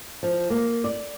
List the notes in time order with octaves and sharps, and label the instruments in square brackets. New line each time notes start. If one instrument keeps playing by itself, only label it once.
[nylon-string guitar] F3
A#3
D5